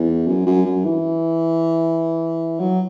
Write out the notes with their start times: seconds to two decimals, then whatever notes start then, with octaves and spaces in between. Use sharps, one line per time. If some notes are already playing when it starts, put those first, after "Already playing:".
Already playing: E2
0.27 F#2
0.46 F#2
0.65 F#2
0.85 E3
2.59 F#3